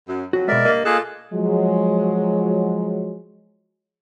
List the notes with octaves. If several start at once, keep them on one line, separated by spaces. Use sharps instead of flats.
F#2
F2 F#3 F#4
B2 G#3 A#4 D5 E5
G2 A#3 D#5
A#3 F4 G#4 A4 F#6
F3 F#3 G#3